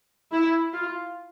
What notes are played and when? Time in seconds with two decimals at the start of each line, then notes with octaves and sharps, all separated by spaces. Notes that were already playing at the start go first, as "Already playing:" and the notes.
0.33 E4
0.73 F4